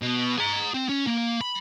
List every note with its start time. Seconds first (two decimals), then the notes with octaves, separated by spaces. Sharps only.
0.02 B2
0.38 G#4 A#5
0.74 C4
0.89 C#4
1.07 A#3
1.41 B5